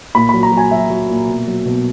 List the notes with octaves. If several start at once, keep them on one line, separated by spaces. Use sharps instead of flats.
A#2 B5
F#3 B5
A#5
F#3
G#5
F#3 E5
F#3
A#2
B2
F#3
B2